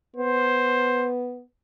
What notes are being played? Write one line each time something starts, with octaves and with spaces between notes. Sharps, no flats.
B3 C5